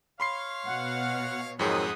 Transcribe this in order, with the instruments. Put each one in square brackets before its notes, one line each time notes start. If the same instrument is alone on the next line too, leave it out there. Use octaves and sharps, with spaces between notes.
[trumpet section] C#5 F5 [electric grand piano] B5 C6 C7
[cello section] B2 [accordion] F#5
[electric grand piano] F2 G#2 G#4 [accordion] D#3 F#3 C4 [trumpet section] F#5 D#6